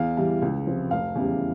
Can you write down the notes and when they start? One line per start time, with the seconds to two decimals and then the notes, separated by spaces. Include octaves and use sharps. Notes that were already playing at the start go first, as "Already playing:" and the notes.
Already playing: E2 F5
0.17 E3 G3
0.42 C#2
0.67 C3 F3
0.91 F1 F5
1.15 E2 C#3 E3 G3